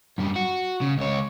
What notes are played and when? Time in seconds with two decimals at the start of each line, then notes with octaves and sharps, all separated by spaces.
0.18 F#2 G3
0.36 F#4
0.81 C#3
0.98 C#2 C#5